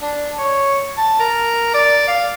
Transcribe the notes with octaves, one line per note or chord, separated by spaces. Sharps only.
D4
C#5
A5
A#4
D5
F5